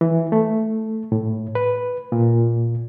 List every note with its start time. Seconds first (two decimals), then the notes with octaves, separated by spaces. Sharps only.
0.01 E3
0.32 A3
1.12 A2
1.55 B4
2.12 A#2